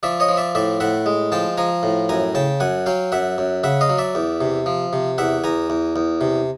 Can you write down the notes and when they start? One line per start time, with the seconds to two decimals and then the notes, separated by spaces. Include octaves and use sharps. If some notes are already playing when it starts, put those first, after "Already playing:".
0.03 F3 D5 E5
0.20 C#5 D#5
0.28 F3
0.37 D5 E5
0.55 A2 D5 E5
0.80 A2 E5 F#5
1.06 G#3
1.32 F3 G5 A5
1.58 F3 G#5 A#5
1.83 A2
2.09 F#2 G#5 A#5
2.35 C#3 G5 A5
2.60 F#2 F#5 G#5
2.86 F#3 F5 G5
3.12 F#2 E5 F#5
3.38 F#2
3.64 C#3 E5 F#5
3.81 D#5 F5
3.89 F#3
3.98 D5 E5
4.15 E2
4.41 C3
4.66 F3
4.93 C3
5.18 E2 E5 F#5
5.44 E2 G#5 A#5
5.70 E2
5.96 E2
6.21 C3